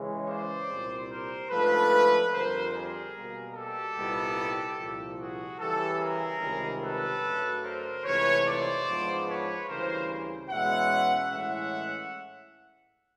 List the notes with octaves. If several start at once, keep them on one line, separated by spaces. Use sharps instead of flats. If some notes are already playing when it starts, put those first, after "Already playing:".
Already playing: C#3 E3 G#3 C#4
C5 D5
C2 A#2 G3 C4
A#4 C5
G#2 F3 A3 D4 A4 B4
F2 D3 G3 A#4 C5
G#4 A#4
B2 G3 A#3
G4 A4
C2 A#2 G3 B3 D#4
C2 A#2 F3
F#4 G#4
C#3 E3 G3 G4 A4
G#4 A#4
C#2 C3 D#3 G3
A4 B4
F#2 C#3 F#3 A3 D4
A#4 C5
C#2 C3 E3 A3 B4 C#5
C5 D5
G#2 F3 G#3 B3 D4
B4 C#5
D2 C#3 E3 G3 A#3 A#4 C5
E2 B2 G#3 C#4 E5 F#5
A2 E3 G#3 C#4 E5 F#5